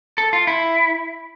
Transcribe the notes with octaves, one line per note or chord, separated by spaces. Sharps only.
A4
F4
E4